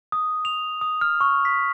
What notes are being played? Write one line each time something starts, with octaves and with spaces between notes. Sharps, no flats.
D#6
F7
D#6
F6
C#6
B6